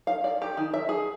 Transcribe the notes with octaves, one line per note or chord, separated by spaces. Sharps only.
F5
D5
G4
D#3
E5
G#4